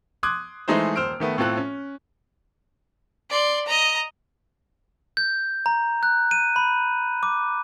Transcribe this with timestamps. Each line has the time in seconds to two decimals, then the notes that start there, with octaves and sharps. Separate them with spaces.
0.23 C6 D6 D#6 F#6 G#6
0.68 E3 G#3 A3 D#4 G#4 C5
0.96 D#1 C5 E6 F6 D7
1.20 D#3 A3 B3
1.38 A2 C4 F4 A4 F#6
1.57 C#4
3.30 D5 C6
3.66 D#5 A#5
5.17 G6
5.66 A#5
6.03 F#6
6.31 D#7
6.56 B5
7.23 D6